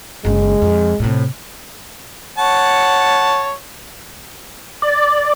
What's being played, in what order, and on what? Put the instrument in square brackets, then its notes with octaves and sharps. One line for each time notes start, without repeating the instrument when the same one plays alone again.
[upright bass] F#1 C#3 [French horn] G#3
[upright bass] F2
A2 C3
[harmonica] C#5 F#5 A5
[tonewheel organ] D5